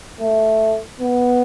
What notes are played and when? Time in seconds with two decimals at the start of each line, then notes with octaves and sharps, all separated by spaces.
0.20 A3
1.00 B3